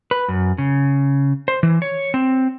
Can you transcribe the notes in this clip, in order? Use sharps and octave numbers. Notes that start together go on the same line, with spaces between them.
B4
F#2
C#3
C5
E3
C#5
C4